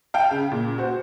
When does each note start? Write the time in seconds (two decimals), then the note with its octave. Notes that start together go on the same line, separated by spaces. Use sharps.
0.14 F5 G5 A5
0.31 C#3
0.51 A#2
0.78 F#4 C5